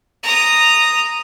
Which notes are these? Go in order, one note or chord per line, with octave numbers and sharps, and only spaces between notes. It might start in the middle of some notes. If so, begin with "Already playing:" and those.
A#5 D#6